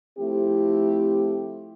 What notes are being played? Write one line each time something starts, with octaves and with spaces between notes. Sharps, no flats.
F3 A3 C4 E4 G4